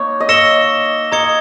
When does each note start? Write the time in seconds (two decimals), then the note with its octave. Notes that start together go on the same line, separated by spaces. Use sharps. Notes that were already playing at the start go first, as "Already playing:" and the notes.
Already playing: A#3 D#4 C#5
0.20 D#5
0.28 C#5 E6 A#6 C#7 E7 G7
1.12 D#5 A#5 D#6 G#6 C#7 G7